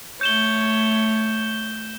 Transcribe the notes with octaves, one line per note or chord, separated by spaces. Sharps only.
A3 C#5 G6 E7 G7